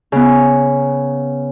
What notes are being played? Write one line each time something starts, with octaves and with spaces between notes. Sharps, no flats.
C#3 B3